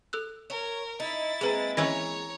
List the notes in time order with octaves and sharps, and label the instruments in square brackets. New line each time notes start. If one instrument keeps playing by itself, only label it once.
[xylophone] A4 E6 F#6
[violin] A#4 [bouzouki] C#5
[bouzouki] D#4 [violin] E4 A6
[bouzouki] G#3 A#3 C4 [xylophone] G#4 B4 A#5
[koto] E3 C#4 B4 [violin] C#5 A#5 [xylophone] D#5 A#6